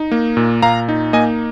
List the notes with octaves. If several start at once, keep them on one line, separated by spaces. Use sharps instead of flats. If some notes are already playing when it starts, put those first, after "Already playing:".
Already playing: D#4
A#3
A#2
A#2 F5 A#5
D#4
A#3 D#5 G#5